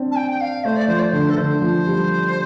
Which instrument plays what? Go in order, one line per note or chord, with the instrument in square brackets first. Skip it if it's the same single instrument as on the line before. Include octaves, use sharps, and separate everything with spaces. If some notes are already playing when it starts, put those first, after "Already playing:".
Already playing: [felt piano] C4 D4
[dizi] A5
G5
G5
F5
[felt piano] A3 [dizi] C5
[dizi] D5
[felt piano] F3 [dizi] C5
[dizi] D5
[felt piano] D3 [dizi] C5
[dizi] A4
[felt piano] D3 [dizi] C5
[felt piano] F3
G3